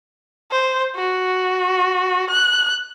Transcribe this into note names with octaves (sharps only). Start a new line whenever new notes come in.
C5
F#4
F#6